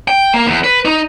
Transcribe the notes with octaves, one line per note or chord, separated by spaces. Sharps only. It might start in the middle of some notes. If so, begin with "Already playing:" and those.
G5
A#3
E2
B4
D#4